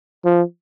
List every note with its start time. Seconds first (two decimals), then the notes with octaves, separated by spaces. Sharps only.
0.25 F3